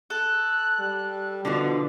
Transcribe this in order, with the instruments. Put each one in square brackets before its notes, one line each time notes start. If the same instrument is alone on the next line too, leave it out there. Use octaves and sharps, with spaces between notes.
[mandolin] A4 [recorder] F#6
[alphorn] G3
[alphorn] B2 [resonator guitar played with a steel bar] D3 E3 F3